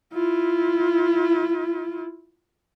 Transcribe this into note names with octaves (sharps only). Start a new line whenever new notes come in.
E4 F4